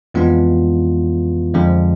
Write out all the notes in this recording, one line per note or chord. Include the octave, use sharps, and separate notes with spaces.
F2 E3 G#3 B3 D4 F4
F2 D3 F3 G#3 D4